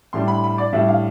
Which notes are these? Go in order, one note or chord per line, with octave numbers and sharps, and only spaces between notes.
A2 G3 D4 C6
B5
B5
D5
A2 G3 D4 E5
F5